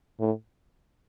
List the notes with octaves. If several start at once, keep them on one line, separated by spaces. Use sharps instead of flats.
A2